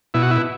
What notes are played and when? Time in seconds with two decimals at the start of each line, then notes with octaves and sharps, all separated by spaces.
0.14 B2 E4
0.22 F#4
0.31 E4